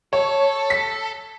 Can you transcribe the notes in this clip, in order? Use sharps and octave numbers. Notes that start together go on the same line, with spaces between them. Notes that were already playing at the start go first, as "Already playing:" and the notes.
A4 C#5
B6